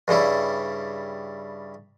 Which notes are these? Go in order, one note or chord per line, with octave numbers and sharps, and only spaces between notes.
G2 C#3 G3 E4